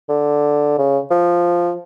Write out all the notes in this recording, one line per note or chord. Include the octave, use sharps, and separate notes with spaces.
D3
C#3
F3